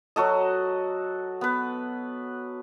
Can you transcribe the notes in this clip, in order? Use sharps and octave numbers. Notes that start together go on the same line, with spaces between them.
F#3 F#4 A4 D#5
B3 B4